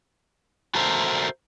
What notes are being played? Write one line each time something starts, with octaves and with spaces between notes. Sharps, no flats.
F#4 A4 A#4 C5 E5